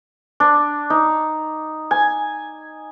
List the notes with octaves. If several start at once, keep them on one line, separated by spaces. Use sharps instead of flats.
D4
D#4
G#5